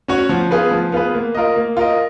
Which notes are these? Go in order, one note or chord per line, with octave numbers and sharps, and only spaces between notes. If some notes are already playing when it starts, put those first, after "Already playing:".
C#4 F#4 C#5
F3
B3 F4 G#4 B4
F3
B3 F4 G#4 B4
A#3
F4 A#4 D#5
A#3
F4 A#4 D#5